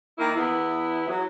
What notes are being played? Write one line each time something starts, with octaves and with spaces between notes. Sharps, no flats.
D#3 A#3 D#4 E4
E2 B3 E4
F#3